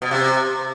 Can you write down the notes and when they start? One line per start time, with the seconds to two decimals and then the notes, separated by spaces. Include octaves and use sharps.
0.02 B2
0.11 C3